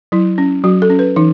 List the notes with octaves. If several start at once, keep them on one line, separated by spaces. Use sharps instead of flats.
F#3 E4
C#4
F#3 F#4
A4
C#4
B4
E3 D#4